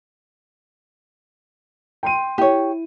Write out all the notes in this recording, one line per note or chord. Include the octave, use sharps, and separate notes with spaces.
G5 C6 D#7
E4 G4 C#5